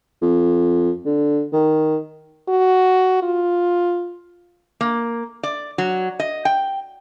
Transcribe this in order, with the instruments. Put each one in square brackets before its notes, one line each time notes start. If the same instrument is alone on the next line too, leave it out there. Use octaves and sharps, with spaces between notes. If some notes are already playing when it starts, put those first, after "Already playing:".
[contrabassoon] F2
D3
D#3
[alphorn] F#4
F4
[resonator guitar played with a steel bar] A#3
D5
F#3
D#5
G5